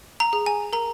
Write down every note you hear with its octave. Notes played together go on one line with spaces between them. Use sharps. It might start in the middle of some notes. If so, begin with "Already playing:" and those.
A#5
G#4
G#5
A#4 A#5